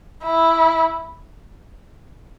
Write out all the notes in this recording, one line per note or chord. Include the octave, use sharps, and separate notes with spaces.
E4